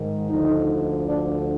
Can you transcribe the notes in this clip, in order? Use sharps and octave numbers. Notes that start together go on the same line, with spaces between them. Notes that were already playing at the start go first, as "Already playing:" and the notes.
Already playing: G#2 D#3
D2 D3 F3 D#4
D4